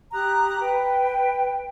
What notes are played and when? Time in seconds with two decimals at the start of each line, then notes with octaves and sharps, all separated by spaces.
0.13 G4 A#5 D#6 F#6
0.61 B4 G5